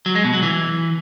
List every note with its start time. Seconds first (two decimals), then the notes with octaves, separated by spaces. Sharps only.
0.06 F#3
0.15 G#3
0.24 B2
0.34 F#3
0.43 E3